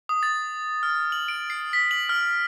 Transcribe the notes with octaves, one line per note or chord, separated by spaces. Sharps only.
D#6
A6
F6
F#7
D7
C7
B6
F#7
F6